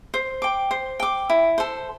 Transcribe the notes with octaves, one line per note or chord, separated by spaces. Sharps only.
C5
G5 D6
C5
G5 D6
E4
A4 C5